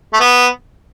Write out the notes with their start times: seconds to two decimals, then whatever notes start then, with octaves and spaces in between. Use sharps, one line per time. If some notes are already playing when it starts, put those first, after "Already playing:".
0.14 A3
0.20 B3